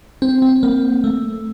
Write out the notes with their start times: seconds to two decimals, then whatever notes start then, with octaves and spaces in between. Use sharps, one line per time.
0.22 C4
0.42 C4
0.63 A#3
1.04 A3